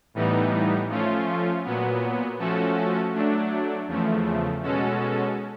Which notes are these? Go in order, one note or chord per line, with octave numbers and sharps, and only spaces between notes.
A2 E3 G3 B3 D#4
F3 A3 C#4 F4
A#2 F#3 B3
F3 A3 C#4 F#4 A4
F#3 A3 D4
E2 C#3 F3 A3
B2 G#3 C#4 F#4 A4